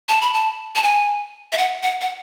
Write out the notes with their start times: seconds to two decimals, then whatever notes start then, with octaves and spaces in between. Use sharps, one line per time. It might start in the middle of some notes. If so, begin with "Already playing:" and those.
0.09 A5
0.22 B5
0.34 A5
0.75 A5
0.83 G#5
1.52 E5
1.58 F#5
1.83 F#5
2.01 F#5